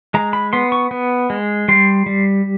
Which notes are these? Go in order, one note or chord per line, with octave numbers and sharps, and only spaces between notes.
G#3 A#5
B5
B3 C6
C#6
B3
G#3
G3 C6
G3